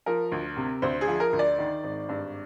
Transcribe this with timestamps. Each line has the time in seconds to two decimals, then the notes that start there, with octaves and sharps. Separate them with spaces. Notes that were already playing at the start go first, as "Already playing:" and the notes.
0.06 F3 A#4
0.32 D2
0.57 C3
0.82 D2 C5
1.01 G#4
1.08 F3
1.20 A#4
1.33 D2
1.39 D5
1.58 D#3
1.84 G#1
2.09 G2